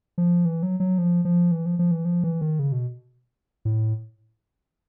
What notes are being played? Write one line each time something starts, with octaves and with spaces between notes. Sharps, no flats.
F3
E3
F#3
F#3
F3
F3
E3
F3
F3
E3
F3
E3
D#3
C#3
B2
A2